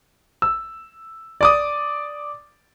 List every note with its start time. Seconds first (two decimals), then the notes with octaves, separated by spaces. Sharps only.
0.42 E6
1.41 D5 D6 D#6